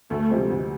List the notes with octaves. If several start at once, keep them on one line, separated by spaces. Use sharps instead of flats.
D2 A3
C3 F3 G#3 C4
D2